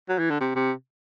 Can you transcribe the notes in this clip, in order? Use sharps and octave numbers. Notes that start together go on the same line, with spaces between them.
F#3
E3
D3
C3
C3